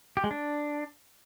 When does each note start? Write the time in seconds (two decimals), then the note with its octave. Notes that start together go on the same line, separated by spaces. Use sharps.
0.17 G4
0.24 G#3
0.31 D4